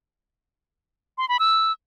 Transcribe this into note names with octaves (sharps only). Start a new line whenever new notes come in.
C6
B5
E6